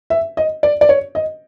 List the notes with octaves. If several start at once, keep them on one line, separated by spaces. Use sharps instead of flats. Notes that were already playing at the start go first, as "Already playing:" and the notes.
E5
D#5
D5
D5
C#5
D#5